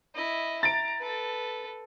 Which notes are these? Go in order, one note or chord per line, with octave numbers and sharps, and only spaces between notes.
E4 D#5
A#5 A6 D7
A4 B4